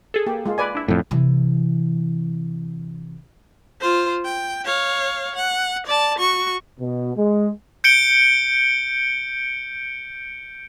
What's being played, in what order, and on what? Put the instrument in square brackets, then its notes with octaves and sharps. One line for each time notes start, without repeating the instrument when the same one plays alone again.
[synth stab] G#4 A4
[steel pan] A#3 G4
G#3 F4
B4 D5 G#5
[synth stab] D4 E4
[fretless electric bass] F2 A2
[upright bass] C3 E3
[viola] F4 C5
G5
C#5 F5
F#5
D5 A5
F#4 C#6
[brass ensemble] B2
G#3
[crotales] G6 C#7 D7 G7